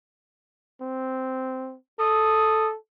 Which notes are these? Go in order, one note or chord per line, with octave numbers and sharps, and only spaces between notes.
C4
A4 D#6